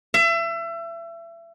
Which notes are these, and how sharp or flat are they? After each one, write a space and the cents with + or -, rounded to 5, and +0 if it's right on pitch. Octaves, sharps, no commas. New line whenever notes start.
E5 +30